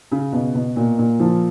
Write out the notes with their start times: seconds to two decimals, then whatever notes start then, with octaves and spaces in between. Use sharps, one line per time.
0.12 C#3
0.33 B2
0.55 B2
0.76 A#2
0.98 A#2
1.20 F3